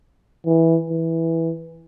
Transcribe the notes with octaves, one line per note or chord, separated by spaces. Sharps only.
E3
E3